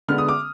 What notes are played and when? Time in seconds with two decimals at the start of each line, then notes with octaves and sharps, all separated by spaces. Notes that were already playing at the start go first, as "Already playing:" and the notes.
0.08 D3 G#3 B3 F6
0.18 D#6
0.29 D6